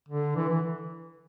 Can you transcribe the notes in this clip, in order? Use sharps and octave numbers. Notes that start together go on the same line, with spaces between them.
D3
E3
E3